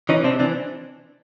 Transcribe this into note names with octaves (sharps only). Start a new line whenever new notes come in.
E3 C#4 D#4
C3 C4 D4
E3 C4 D4